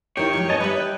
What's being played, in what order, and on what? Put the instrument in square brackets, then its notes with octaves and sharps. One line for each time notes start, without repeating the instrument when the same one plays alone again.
[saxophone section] D#3 [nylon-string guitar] E4 C5 [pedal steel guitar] G4 G5 [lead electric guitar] C#5
[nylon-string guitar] F3 F#3 G#3
[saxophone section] E2 D#3 D#5 [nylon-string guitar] G2 D4 [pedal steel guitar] D#4 G#5 A5
[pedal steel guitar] G3 D#5 B5 [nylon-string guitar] G4 E5 [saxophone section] B4
[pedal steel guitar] G5